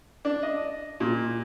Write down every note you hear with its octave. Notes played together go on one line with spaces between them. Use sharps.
D4
D#5
A#2